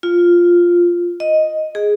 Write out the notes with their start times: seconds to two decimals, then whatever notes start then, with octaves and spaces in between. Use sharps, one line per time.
0.03 F4
1.20 D#5
1.75 G#4